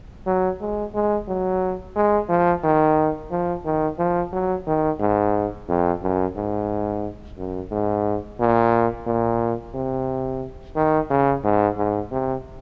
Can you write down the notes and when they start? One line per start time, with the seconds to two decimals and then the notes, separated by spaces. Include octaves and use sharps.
0.26 F#3
0.61 G#3
0.94 G#3
1.28 F#3
1.96 G#3
2.29 F3
2.64 D#3
3.31 F3
3.65 D#3
3.99 F3
4.32 F#3
4.67 D#3
5.00 G#2
5.68 F2
6.02 F#2
6.36 G#2
7.38 F#2
7.71 G#2
8.40 A#2
9.06 A#2
9.75 C3
10.76 D#3
11.10 C#3
11.44 G#2
11.77 G#2
12.12 C3